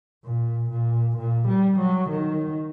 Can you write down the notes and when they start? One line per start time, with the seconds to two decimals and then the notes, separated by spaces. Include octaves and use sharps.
0.24 A#2
0.70 A#2
1.17 A#2
1.48 G3
1.79 F#3
2.10 D#3